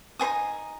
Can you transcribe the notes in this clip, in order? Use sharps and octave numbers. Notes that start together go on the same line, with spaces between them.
D#4 C5 G#5 D#6